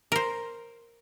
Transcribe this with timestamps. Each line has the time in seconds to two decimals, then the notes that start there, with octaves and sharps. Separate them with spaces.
0.12 A#4 C5